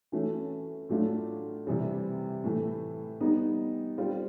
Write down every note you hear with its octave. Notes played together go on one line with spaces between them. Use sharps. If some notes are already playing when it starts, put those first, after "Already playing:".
E3 A3 C#4 F#4
A2 F#3 A3 D4 F4
C3 E3 G3
A2 E3 A3
G3 B3 D#4
G3 C4 F4